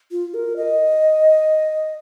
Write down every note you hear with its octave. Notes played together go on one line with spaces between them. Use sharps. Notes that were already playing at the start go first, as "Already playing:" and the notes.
F4
A#4
D#5